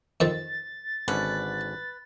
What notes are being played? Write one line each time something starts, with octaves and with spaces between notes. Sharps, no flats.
F2 D#3 C4 A6
G#1 D3 C#4 B4